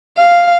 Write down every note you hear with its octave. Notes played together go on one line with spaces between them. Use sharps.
F5